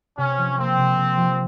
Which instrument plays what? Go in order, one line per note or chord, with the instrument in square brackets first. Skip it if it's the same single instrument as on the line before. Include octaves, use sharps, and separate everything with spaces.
[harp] C3 [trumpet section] C#4
[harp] F3
[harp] A#3 [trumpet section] C4
[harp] C3
C3
F3